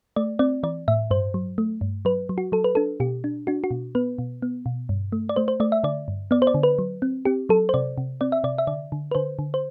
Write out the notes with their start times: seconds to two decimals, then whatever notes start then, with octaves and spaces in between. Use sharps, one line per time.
0.16 A3 D5
0.39 C4 D5
0.63 E3 D5
0.88 A2 E5
1.11 G2 C5
1.34 F#3
1.58 A3
1.81 G2
2.05 F#3 B4
2.29 F#3
2.38 F#4
2.52 F#3 A4
2.64 B4
2.75 D4 A4
3.00 B2 G4
3.24 D4
3.47 D4 F#4
3.64 F#4
3.71 B2
3.95 B3 B4
4.18 B2
4.42 B3
4.66 B2
4.89 G2
5.12 A3
5.29 D5
5.36 A3 C5
5.48 C5
5.60 A3 D5
5.72 E5
5.84 D3 D5
6.08 G2
6.31 B3 D5
6.42 C5
6.47 D5
6.54 D3
6.63 B4
6.79 F#3
7.02 C4
7.25 C4 G4
7.49 F#3 A4
7.69 C5
7.74 C3 D5
7.98 C3
8.21 C4 D5
8.32 E5
8.44 C3 D5
8.58 E5
8.67 D3 D5
8.92 D3
9.11 B4
9.15 D3 C5
9.39 D3
9.54 C5